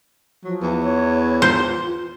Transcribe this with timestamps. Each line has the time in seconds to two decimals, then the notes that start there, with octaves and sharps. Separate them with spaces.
0.44 F3 F#3
0.62 E2
0.83 C#5
1.42 F4 C5